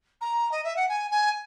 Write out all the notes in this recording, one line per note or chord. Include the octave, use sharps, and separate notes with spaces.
A#5
D#5
E5
F#5
G#5
G#5